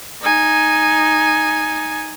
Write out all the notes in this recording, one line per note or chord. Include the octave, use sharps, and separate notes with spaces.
D#4 G#5